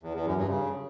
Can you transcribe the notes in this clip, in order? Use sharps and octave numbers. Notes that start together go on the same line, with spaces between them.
E2
E2
F#2
G2
C#3